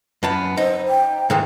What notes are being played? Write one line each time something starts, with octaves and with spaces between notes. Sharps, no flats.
F#2 B3 A5
D#4 C5
G5
G#2 D#3 E3